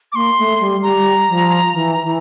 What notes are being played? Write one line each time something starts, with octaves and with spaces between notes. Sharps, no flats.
D6
A#3 C6
A3
G3
G3 A#5
F3
E3
E3